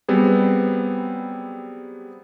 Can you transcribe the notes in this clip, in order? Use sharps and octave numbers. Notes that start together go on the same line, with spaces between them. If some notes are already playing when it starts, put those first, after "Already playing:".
F#3 G3 B3 C4 G#4